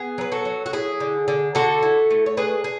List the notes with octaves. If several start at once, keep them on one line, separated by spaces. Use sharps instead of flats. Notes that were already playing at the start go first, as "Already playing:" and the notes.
Already playing: B3 G#4
F#3 B4
F#4 A4
F#3
F#4
E4 G#4
D3
D3
D3 F#4 A4
E4
A3
C#5
D4 G#4 B4
G#4